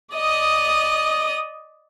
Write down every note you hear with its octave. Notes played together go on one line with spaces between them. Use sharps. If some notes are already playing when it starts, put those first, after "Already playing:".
D5 D#5 D#6